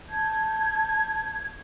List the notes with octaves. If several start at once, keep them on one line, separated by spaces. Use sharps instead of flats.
A5 G6 G#6